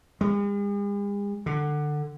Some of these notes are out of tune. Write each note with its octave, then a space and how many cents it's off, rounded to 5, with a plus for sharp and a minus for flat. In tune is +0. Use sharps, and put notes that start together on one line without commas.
G#3 -45
D3 +20